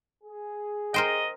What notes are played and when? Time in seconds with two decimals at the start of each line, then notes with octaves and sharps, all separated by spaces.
0.24 G#4
0.94 A#4 C5 D#5 G5